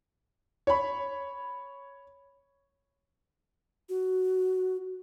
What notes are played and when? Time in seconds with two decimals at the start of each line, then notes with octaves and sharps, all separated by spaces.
0.67 C#5 B5
3.89 F#4